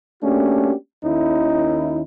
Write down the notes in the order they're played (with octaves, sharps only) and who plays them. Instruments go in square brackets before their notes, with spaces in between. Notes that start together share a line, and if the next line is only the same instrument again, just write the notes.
[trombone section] A3 A#3 C#4 D4 F#4 G4
D#2 D#3 C#4 D#4 E4